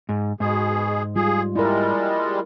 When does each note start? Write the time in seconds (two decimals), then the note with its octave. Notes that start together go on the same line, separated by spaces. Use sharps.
0.09 G#2
0.40 G#2 B2 G#4
1.16 G3 F4 G#4
1.56 G3 G#3 E4 A#4